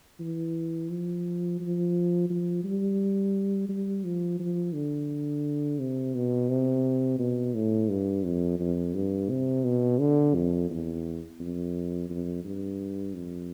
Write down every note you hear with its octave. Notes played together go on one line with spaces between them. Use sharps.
E3
F3
F3
F3
G3
G3
F3
F3
D3
C3
B2
C3
B2
A2
G2
F2
F2
G2
C3
B2
D3
F2
E2
F2
F2
G2
F2